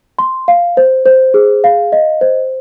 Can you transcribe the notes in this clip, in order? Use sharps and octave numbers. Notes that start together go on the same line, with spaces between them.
C6
F5
C5
C5
G#4
F5
D#5
C5